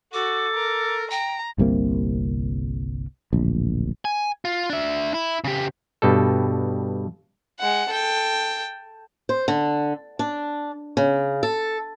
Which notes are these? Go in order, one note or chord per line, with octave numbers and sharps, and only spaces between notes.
F#4 A4 D6
A#4
G5 A#5
G1 C2 C3 A#3
D1 A#1
G#5
F4
D4 E5
E4
C#3 G4
G2 B2 G3 A4
G#3 F#5
A4 G5
C5
D3
D4
C#3
A4